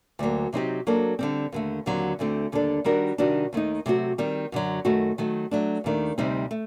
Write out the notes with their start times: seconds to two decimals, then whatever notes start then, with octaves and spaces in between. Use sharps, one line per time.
0.19 D2 D3 F#3 A#3
0.53 C3 F#3 C4 D#4 G4
0.87 F#3 A#3 D4 A4
1.19 D3 G3 C4
1.52 D#2 D3 A3
1.86 D#2 D3 F#3 C4
2.19 D2 D3 A3 C4
2.52 D#2 D3 G3 D4 A4
2.84 D#3 G3 D4 F#4 A#4
3.18 C3 D#3 G3 D4 F#4
3.53 D#2 D#3 A3 D#4
3.86 C3 F#3 A3 C4 F#4
4.18 D#3 G3 C4
4.52 F#2 D3 F#3
4.85 F#2 D#3 A3 D#4 F#4
5.18 D#3 F#3 A3
5.51 F#3 A3 D4
5.84 D#2 D#3 A3 D4
6.18 D2 C3 G3 C4 D#4
6.51 A3